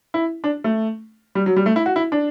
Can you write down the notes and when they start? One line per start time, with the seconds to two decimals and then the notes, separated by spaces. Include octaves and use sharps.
0.14 E4
0.44 D4
0.64 A3
1.35 G3
1.46 F#3
1.56 G3
1.66 A3
1.76 E4
1.86 F#4
1.96 E4
2.12 D4